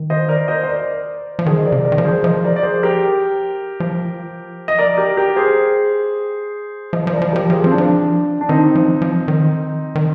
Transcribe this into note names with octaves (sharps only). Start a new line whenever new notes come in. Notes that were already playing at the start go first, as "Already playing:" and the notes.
Already playing: D#3
C5 D#5
A#4 D5
C5 D#5
C5
A#4 D5
F3
D#3 G#4 C5
D#5
A#4 D5
C3
A#4 D5
D#3
F3
G#4 C5
F3 C5 D#5
A#4 D5
D5
G#4 C5
G4 A#4
F3
D#5
A#4 D5
G4 A#4
G4 A#4
G#4 C5
F3 C5 D#5
F3 C5
A#4 D5
F3
F3 G4 A#4
F3 F4 G#4
F3 C4
D4
F3
D4
D#3 C4 D#4
F3
F3
D#3
D#3